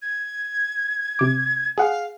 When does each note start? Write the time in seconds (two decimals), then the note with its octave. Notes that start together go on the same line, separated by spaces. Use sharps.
0.02 G#6
1.19 C3 D6
1.78 G#4 F5 F#5